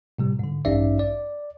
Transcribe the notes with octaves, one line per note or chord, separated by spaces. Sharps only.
A2 C3 G3
G#2 D3
A1 G2 C#4 D#4 D5 E5
D5